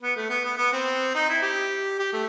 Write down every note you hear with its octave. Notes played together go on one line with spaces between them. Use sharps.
B3
A3
B3
B3
B3
C4
D#4
E4
G4
G4
A3